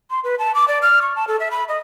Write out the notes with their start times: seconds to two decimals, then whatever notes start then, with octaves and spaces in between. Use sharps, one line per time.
0.11 C6
0.24 B4
0.39 A5
0.55 D6
0.68 D5
0.82 F6
1.02 C#6
1.16 A5
1.28 A4
1.40 E5
1.51 B5
1.68 D#5